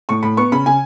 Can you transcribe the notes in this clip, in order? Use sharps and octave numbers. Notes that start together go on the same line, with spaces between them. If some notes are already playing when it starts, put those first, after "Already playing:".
A2 C#6
A2 B5
B3 C#6
C#3 B5
C#3 G#5